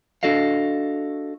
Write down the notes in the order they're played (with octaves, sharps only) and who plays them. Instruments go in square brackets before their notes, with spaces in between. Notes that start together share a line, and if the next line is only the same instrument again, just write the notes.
[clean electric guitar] D4 F#4 A4 D#5 F5